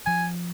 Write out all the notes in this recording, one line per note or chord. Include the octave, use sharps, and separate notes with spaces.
F3 G#5